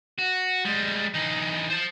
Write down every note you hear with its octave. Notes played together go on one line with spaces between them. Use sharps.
F#4
G3 G#3
E3 D#4
C5 A5